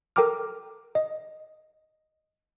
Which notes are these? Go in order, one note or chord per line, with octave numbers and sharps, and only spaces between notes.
A4 A#4 G5 A#5 D6 F6
D#5